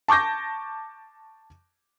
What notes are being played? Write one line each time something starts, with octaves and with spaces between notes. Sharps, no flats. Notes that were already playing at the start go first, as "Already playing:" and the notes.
A5 C#6 D6 G6 A#6